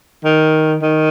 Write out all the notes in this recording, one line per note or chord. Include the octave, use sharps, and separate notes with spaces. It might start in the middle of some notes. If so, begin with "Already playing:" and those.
D#3
D#3